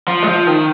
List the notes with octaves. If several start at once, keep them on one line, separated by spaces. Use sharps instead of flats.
F3
G#3
F3
D#3